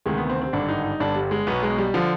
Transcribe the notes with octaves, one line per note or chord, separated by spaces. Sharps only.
D2 C3 D#3 G#3
B3
C4
C4
G#1 G2 D3 D4
D#4
D#4
G1 G2 D3 D4
G3
G#3
B1 B2 B3
G#3
G3
D3 F3